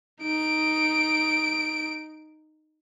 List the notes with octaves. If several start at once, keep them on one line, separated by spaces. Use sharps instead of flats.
D#4 D7